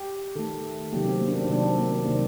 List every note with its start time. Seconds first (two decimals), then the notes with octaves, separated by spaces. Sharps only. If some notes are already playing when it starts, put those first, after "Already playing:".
Already playing: G4
0.36 D#3 A3 A4
0.93 C3 D#3 F#3 A#3 G4
1.07 C4
1.21 A#3
1.28 D4
1.36 C4
1.44 D4
1.50 C3 D#3 F#3 A#3 C4
1.64 C4
1.78 A#3
1.93 C4
2.07 C3 D#3 F#3 A#3 C4